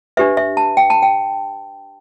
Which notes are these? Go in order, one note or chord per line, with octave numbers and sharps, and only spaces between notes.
D4 G4 B4 E5
E5
A5
G5
A5
G5